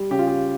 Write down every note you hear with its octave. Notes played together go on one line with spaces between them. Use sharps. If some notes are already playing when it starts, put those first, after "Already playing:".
Already playing: G3
C#3 G4
F4
G4